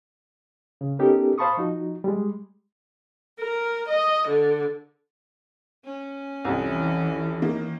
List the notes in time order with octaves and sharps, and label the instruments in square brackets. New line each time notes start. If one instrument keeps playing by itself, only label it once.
[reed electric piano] C#3
B3 C#4 D#4 G4 A4 A#4
C5 F5 A5 B5 C#6 D#6
F3 D#4 F#4
G3 G#3
[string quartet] A#4
D#5
D3
[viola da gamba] C#4
[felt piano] C2 F2 [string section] E3
[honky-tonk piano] D#3 A#3